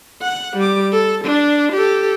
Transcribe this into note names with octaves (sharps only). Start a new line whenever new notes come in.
F#5
G3 D6
A4
D4
G4 A4